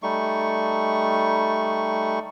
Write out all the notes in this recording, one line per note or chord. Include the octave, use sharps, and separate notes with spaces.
G3 A3 D#4 C#6